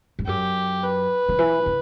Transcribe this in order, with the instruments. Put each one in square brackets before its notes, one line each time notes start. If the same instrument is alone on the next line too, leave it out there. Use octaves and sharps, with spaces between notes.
[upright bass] G2
[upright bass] F#2 [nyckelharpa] G4
[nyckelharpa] B4
[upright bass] D3
E3
C#3